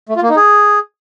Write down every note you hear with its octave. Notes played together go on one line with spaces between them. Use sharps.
A3
F4
A#3
D#4
G#4